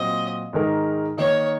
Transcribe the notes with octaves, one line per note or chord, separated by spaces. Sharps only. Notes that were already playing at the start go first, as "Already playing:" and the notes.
Already playing: A#2 F#3 C4 D#5
G#2 D#3 G#3 D#4 A#4
D#3 A#3 D#4 C#5